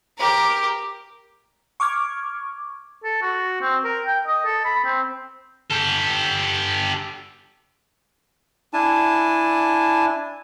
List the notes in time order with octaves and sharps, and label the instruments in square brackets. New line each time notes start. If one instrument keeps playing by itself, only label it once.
[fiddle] G4 A#4
[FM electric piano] C#6 D6 F6 G#6
[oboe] A4
F#4
C4
A#4
G5
D#5
A4
B5
C4
[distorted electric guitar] G4 A4
[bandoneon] D4 E4 G#5 A5